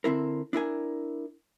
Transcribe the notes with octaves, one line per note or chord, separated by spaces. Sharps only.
D3 C4 E4 A#4
D4 E4 A#4 G#5